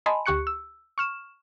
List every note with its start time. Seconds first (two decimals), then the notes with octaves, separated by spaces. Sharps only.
0.06 D#5 G#5 A5 B5 C6
0.26 D2 G4 C#6 F#6 C#7
0.47 E6
0.98 C#6 F6 E7